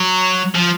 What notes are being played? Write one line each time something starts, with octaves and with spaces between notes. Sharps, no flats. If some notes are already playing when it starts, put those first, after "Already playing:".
Already playing: F#3
F3